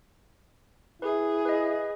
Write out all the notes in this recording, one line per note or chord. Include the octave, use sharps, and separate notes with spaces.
E4 G#4 B4
B4 D#5